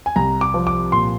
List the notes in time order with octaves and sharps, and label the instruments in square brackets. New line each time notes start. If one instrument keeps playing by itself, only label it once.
[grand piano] G#5
C2 A#5
D6
F3
D6
A#2 C6